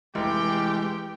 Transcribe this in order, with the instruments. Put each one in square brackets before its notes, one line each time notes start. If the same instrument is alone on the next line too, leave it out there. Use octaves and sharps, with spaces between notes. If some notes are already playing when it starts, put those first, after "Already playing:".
[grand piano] F1 [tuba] E3 [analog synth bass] G#3 [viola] G4 G5